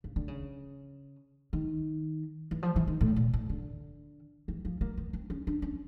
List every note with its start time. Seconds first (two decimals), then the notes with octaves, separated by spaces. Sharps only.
0.04 C#3
0.16 D3
0.28 C#3
1.53 D#3
2.51 E3
2.63 F3
2.76 E3
2.87 D#3
3.01 A2
3.16 A#2
3.34 A2
3.49 D3
4.48 E3
4.65 F3
4.81 A#3
4.97 B3
5.13 C4
5.30 C#4
5.47 D4
5.62 C#4